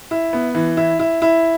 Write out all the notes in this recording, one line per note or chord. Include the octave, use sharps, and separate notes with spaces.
E4
B3
E3
E4
E4
E4